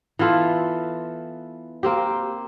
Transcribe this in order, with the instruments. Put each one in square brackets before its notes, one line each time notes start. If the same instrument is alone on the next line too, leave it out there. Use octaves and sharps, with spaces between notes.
[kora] E3 B3 F4 A4
A#3 C4 G4